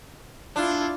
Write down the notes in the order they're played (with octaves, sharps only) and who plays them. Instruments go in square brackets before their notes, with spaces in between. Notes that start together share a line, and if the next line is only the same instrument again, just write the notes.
[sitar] D4 [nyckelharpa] E4 F4